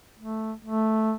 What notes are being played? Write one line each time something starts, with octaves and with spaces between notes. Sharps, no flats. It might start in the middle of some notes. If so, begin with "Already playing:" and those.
A3
A3